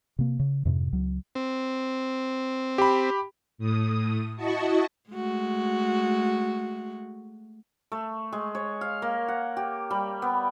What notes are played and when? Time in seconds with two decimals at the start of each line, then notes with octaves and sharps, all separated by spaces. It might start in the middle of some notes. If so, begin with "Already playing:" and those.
0.19 C3 A#3
0.39 C#3
0.65 F2 G#2 C3
0.92 C#2 F#3
1.35 C4
2.78 G4 B5
3.58 A2 D#6
4.36 E4 F#4 D#5 A5 C#6
5.10 G#3 A3 F#4
7.92 A3
8.32 G#3
8.55 C#5
8.81 F5
9.02 A#3
9.28 F#5
9.57 G4
9.91 G3
10.22 B3